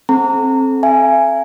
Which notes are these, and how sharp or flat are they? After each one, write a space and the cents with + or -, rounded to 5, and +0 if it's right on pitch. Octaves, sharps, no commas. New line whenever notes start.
C4 +20 A4 -30 A#5 -25
E5 +45 G#5 +0